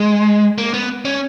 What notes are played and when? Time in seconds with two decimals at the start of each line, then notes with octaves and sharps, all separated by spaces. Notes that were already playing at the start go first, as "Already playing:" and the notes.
Already playing: G#3
0.58 A#3
0.74 B3
1.05 C#4